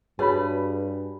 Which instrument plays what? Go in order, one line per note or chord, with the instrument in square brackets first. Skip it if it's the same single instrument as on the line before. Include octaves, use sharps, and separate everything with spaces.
[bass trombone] G2 [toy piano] F#4 B4 C#5 [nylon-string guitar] G#4 [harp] A5 B5